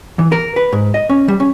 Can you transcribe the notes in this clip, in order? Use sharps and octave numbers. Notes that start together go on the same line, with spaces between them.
E3
A#4
B4
G#2
D#5
C#4
G3
C#4